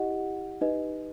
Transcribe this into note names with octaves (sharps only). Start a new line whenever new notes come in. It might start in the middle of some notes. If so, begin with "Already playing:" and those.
Already playing: E4 G4 D#5 F#5
D#4 G4 B4 D#5